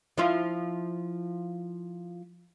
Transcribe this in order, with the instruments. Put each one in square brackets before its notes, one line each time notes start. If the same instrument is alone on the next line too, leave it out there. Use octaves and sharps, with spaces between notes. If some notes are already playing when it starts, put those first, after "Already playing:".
[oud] F3 E4 F4